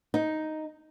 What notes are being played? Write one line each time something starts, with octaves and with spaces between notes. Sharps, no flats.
D#4